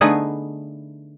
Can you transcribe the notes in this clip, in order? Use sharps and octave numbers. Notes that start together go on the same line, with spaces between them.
D3 A3 B3 D#4 G#4 B4